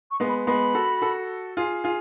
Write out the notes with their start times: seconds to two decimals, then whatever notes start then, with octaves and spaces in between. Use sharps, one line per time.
0.11 C#6
0.20 G#3 B3
0.29 B5
0.47 G#3 B3 B5
0.75 F#4 A4
1.02 F#4 A4
1.57 F4 G#4
1.84 F4 G#4